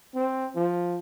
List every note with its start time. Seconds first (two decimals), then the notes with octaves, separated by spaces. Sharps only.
0.15 C4
0.55 F3